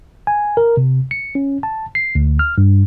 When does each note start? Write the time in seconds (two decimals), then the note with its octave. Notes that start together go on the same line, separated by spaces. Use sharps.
0.27 G#5
0.57 A#4
0.77 C3
1.11 C#7
1.35 C#4
1.63 A5
1.95 C7
2.15 D2
2.39 F6
2.58 G2